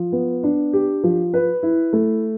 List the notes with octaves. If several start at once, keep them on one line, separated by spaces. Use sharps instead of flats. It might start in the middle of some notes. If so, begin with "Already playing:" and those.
Already playing: F3
B3
D4
G4
F3
B4
E4
A3